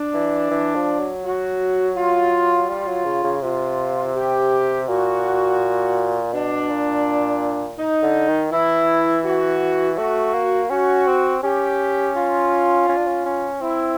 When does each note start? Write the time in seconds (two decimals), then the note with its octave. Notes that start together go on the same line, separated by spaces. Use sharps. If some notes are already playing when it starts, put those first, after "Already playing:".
Already playing: D4
0.14 E3
0.50 E3
0.75 F3
0.99 F#3
1.23 F#4
1.96 F4
2.69 G3 F4
2.87 F#3
3.05 C#3
3.24 C#3
3.42 C3 F4
4.15 G4
4.88 A#2 F#4
6.33 B2 D4
6.70 A#2
7.79 D#4
8.03 D3
8.28 D#3
8.52 E3 E4
9.25 F#4
9.97 A3 F#4
10.34 A#3
10.70 C#4 F#4
11.07 C4
11.43 C#4 G4
12.16 F4
12.89 C#4
12.97 D4
13.07 C#4
13.25 C#4
13.61 C4 E4